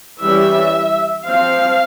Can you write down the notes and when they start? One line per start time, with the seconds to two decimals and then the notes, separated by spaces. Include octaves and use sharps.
0.20 E3 G3 C#4 E5
1.26 F3 C4 F5